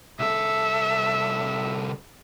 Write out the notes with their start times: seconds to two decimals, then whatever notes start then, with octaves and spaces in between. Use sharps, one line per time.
0.19 C2 A4 E5